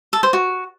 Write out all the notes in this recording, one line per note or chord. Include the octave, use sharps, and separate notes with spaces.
A4
C5
F#4